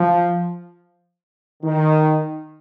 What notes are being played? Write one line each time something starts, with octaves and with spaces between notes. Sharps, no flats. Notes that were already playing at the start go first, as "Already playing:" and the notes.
Already playing: F3
D#3